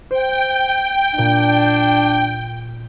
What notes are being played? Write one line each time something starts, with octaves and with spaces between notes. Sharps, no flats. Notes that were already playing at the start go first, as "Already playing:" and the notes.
C5 G5
A#2 D4 D7